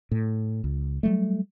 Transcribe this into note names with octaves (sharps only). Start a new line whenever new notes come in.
A2
C#2
F#3 G3 A3